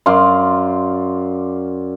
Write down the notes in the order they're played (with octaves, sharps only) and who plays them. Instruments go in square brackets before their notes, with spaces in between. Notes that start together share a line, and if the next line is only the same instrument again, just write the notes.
[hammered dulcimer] F#2 D5 F5 C6